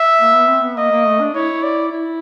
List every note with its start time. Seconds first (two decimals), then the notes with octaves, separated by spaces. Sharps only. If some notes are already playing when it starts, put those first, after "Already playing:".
Already playing: E5
0.20 A#3
0.34 B3
0.48 C4
0.63 B3
0.77 A#3 D#5
0.92 A#3
1.06 A3
1.20 D4
1.34 E4 C#5
1.63 D5
1.91 E4